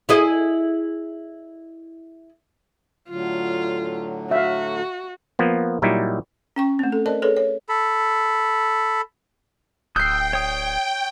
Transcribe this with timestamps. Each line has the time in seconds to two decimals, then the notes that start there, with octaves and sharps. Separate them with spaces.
0.09 E4 G#4 D#5
3.09 A2 D3 F#3 F4
4.31 F#4 E5 F5
5.39 F3 A#3 B3
5.82 A#2 F#3 G3 D#4 E4
6.56 C#4 G5 C#6
6.79 A3 C4
6.92 A4
7.06 A#4 C5 D5 D#5 A5
7.22 G#4 A4 B4 C#5
7.37 C#5
7.69 A4 B5
9.96 D1 G5 D#6 E6 F#6 G6 C7
10.33 C#5 D#6